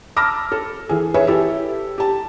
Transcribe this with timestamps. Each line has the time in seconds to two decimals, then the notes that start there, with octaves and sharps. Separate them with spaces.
0.16 A5 B5 D6 E6 F6 A#6
0.52 A4
0.89 E3 G#4
1.14 G#4 B4 C#5 E5
1.27 E4 G4 A4
1.98 G4 A5